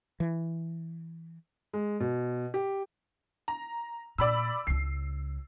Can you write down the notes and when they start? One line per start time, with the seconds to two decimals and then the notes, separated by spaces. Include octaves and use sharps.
0.20 E3
1.73 G#3
2.00 B2
2.54 G4
3.48 A#5
4.18 A#2 D5 B5 E6
4.67 C#2 C#3 C7